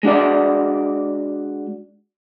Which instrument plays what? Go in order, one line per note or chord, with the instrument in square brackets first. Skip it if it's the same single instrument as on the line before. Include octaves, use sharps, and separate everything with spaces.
[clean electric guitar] G#3 D4 F#4 D5